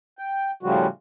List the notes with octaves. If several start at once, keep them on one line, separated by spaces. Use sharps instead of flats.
G5
A2 C#3 F3 G3 F#4